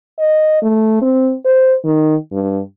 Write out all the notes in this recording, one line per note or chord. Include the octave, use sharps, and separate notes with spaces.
D#5
A3
C4
C5
D#3
G2